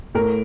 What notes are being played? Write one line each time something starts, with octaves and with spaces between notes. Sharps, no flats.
A2 A#4